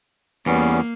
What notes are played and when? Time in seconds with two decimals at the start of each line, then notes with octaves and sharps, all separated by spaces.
0.46 E2 G3 A#3 B3 C#4